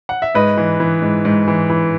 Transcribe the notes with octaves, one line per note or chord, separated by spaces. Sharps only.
F#5
E5
G#2 B4 D#5
E3
E3
G#2
G#2
E3
E3